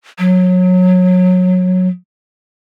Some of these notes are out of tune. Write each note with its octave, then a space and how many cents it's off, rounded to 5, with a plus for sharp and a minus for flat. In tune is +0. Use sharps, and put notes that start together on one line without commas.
F#3 -20